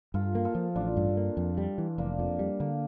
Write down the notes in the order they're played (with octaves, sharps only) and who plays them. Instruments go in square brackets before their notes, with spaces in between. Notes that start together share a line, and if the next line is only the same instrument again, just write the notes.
[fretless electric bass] G2 [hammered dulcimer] F4 A4
[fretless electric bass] A#3
[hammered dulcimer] F4 A4
[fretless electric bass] F3
[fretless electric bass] A1 [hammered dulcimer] D4 F4
[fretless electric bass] G2
A#3
F2
G3
E3
[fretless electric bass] F1 [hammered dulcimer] A#3 D4
[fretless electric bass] F2
G3
[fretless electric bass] D3 [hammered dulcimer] A#3